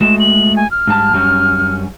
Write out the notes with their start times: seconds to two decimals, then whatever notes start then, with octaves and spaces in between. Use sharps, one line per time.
0.01 G#3 A3 F#4 E7
0.20 F#7
0.56 G#5
0.71 F6
0.87 G#2 G3 A5
1.13 F#2 G3 C#4